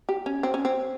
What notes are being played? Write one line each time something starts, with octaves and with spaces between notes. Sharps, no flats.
G4
C#4
C4
C#4
C4